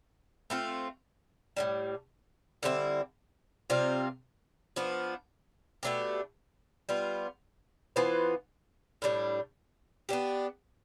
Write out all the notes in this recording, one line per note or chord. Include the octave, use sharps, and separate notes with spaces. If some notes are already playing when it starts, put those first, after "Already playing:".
A3 C4 F4
A2 E3 G3
D3 G3 C4 E4
C3 G3 C4 F4
F3 B3 D4
B2 A3 D4 G4
G3 B3 F4
E3 B3 F4 C5
A2 G3 D4
B3 D4 G4